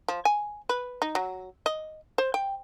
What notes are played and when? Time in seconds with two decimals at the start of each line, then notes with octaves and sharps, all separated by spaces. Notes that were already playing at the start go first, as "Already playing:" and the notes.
0.08 F3
0.25 G#5
0.69 B4
1.02 D#4
1.15 F#3
1.66 D#5
2.18 C5
2.34 G5